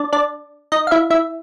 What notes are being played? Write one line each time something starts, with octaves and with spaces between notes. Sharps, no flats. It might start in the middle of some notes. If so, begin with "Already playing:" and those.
Already playing: D4 D5
D4 D5
D#4 D#5
F5
E4 E5
E4 E5